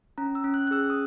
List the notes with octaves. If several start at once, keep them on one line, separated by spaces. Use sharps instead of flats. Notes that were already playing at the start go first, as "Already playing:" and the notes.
C#4 A#5
E6
C#4
F#6
F#6
G#4 E6
D#6